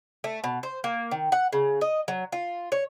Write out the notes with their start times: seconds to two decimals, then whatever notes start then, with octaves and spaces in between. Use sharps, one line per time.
0.24 A3
0.44 B2
0.63 C5
0.84 A#3
1.11 D#3
1.32 F#5
1.53 C#3
1.81 D#5
2.08 F#3
2.32 F4
2.72 C#5